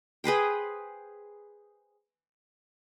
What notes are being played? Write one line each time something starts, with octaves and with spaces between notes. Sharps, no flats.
G#4 B4 C5 G5